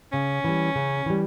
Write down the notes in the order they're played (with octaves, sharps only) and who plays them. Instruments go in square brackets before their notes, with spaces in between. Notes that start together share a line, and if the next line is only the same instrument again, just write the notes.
[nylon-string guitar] C#3 [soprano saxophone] C#4
[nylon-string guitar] E3 G3
C#3
E3 G3